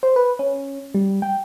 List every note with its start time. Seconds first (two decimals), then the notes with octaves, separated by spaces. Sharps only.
0.03 C5
0.16 B4
0.39 C#4
0.95 G3
1.22 G5